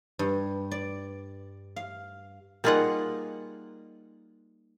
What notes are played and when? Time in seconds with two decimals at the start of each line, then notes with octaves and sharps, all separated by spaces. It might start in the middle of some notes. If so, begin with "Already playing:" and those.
0.19 G2
0.71 D5
1.76 F5
2.64 G3 A#3 D#4 F4 G#4 F#5